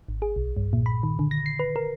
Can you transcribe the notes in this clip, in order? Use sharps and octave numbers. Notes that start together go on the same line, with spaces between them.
G#1
G#4
B1
G2
A#2
B5
D#3
D3
A#6
C7
B4
A#4